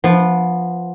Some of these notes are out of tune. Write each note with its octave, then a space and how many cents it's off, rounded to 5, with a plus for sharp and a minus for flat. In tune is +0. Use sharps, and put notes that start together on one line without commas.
F3 +0 B3 -15